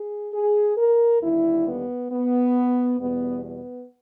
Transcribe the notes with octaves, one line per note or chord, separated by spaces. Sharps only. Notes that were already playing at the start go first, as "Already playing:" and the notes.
Already playing: G#4
G#4
A#4
D#2 D3 G3 E4
B3
B3
E2 B2 G3 B3
B3